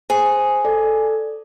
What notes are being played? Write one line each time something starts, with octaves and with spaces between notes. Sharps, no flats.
G#4 C5
A4 D5